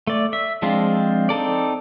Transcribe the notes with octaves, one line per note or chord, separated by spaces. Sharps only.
A3 D5
E5
F3 G#3 C4 D4 F4
C4 D#4 A4 D5